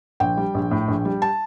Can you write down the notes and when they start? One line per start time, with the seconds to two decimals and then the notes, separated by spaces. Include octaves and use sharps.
0.20 A#1 G5
0.37 G3
0.54 A#1
0.71 A2
0.88 A#1
1.05 G3
1.22 A5